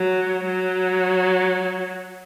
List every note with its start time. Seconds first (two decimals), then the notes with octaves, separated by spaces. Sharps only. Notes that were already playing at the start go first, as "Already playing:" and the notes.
Already playing: F#3
0.45 F#3